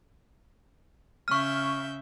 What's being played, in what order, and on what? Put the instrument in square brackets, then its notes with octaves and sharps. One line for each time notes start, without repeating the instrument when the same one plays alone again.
[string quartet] C#3 E5 G6 [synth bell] C#6 F6